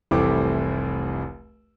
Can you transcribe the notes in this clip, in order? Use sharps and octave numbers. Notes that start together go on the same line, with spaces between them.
F1 C2 E3 A3 C4 D6